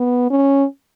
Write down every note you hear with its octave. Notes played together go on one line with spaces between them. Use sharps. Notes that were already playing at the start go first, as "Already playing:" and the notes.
Already playing: B3
C#4